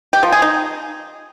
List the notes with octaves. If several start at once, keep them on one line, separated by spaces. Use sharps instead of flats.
G4
F3
G#4
D#4